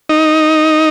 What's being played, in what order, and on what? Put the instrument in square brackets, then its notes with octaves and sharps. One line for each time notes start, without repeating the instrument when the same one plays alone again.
[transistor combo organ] D#4